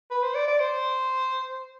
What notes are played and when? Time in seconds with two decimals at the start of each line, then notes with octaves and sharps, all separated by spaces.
0.11 B4
0.23 C5
0.35 D5
0.48 D5
0.60 C5